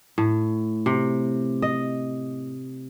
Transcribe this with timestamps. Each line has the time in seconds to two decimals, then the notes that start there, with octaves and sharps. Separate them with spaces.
0.18 A2
0.86 C3
1.62 D#5